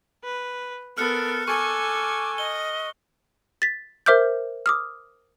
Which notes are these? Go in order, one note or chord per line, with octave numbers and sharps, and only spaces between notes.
B4
B3 A4 A#4 F6 F#6 C#7
A4 G#5 C#6 D6
D#5 G7
A6 B6
A#4 C5 E5 D6 F6 G6
D6 D#6 F6